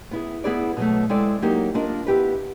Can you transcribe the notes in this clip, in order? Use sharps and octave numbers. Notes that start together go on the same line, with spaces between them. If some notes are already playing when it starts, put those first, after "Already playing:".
B3 E4 G#4
B3 E4 G#4 B4 D5
B2 F#3 A3
G#3 C4 E4 A4 D5
F#3 A#3 D#4 G4
A#3 D4 F4 A#4 D#5
B3 E4 G4 B4